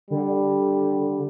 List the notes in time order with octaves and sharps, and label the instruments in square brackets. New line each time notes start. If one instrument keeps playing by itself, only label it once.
[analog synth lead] D3 [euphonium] G3